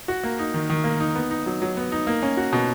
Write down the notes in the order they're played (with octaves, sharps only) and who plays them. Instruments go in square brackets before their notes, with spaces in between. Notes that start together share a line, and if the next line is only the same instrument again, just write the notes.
[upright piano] F#4
A#3
D#4
D#3
D#3
A#3
D#4
B3
D#4
F#3
F#3
B3
D#4
A#3
C#4
F#4
B2